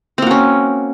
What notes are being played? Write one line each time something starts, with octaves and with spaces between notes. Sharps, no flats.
A#3 C4 C#4 F#4